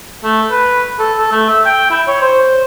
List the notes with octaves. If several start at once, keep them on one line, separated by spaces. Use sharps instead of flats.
A3
B4
A4
A4
A3
E5
G5
E4
C#5
C5